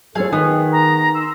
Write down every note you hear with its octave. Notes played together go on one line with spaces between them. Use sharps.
C2 F#3 F4 G#4 A4 C#5 F5
D#3 B3 D#4 G#4
A#5
C6 E6